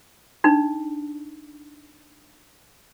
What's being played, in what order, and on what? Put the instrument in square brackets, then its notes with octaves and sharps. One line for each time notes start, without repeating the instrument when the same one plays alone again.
[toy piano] D4 D#4